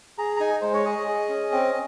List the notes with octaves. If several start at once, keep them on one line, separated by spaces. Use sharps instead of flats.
G#4 A#5
A#5
D#4 G#5
G#3 C5
C#5
G#4 D#5
G#4
C#4
C4